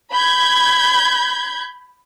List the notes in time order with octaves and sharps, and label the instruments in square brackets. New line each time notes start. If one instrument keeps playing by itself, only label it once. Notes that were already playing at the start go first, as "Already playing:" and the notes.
[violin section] B5 G6 G#6